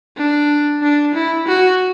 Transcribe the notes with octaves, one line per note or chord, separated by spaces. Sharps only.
D4
D4
E4
F#4